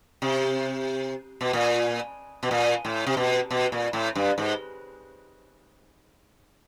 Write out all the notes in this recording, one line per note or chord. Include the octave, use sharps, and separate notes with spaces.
C3
B2
A#2
B2
A#2
A2
C3
B2
B2
A#2
A2
G2
G#2